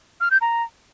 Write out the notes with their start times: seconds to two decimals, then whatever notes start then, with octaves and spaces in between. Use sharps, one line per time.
0.21 F6
0.31 G6
0.41 A#5